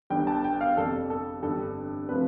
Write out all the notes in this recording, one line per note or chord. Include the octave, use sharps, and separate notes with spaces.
G1 G2 D3 G5
A5
G5
F5
F2 C3 G3 A4
A4
G1 G2 D3 A4
C3 F3 A3 B4